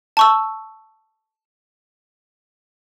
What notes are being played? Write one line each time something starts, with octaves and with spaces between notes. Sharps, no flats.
A5 C#6 E6